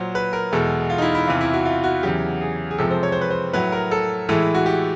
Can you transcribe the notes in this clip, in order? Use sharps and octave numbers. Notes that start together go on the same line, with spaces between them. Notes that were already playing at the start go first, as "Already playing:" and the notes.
Already playing: A#2 F#3 C5
B4
A#4
E2 B2 G#3 A4
F4
D#4
E4
E4
E2 C3 E3 F4
E4
F#4
F4
F#4
E2 C#3 F#3 G4
G#4
G#4
F2 C3 F3 G#3 A4
C5
C#5
C5
B4
C5
A2 F#3 B4
A#4
A4
A2 E3 G#3 A4
F#4
G4